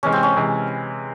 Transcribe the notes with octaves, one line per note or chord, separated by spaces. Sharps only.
C3 E3 G#3 C#4
C4
C#4
C3 E3 G#3